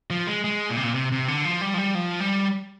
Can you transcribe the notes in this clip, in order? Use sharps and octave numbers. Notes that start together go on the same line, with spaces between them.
F3
G#3
G#3
A#2
C3
A#2
C3
C3
D3
F3
G3
F3
G3
F3
G3